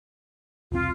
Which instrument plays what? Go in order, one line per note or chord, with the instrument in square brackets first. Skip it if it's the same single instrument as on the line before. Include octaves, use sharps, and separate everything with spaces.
[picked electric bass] E1 C2 C4 [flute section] F4